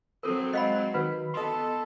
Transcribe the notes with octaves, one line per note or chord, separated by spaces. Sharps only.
F#3 C4 A4 A#4
G#3 D#5 F5 F#5 B5
D#3 F#4 B4 B5
B3 A4 D#5 C6